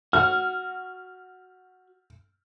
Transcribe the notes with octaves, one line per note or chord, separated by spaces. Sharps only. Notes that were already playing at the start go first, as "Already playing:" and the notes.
F#4 F6